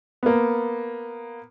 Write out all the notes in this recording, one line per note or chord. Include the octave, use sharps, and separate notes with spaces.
A#3 B3